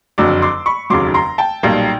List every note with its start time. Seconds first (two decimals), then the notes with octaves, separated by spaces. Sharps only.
0.18 F#1 F2 D3 F#3 D6 E6
0.42 C6 D6
0.66 B5 C#6
0.90 F1 D#2 C#3 F#3 C6 D6
1.14 A#5 C6
1.38 G5 A5
1.63 B1 A#2 G3 A#3